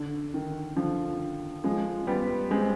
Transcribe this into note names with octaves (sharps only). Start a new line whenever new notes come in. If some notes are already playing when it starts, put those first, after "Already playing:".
Already playing: D3
D#3
D3 F3
F3 G#3
G3 B3
G#3 C4